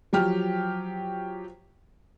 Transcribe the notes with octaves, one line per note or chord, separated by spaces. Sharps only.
F3 F#3 G4 F6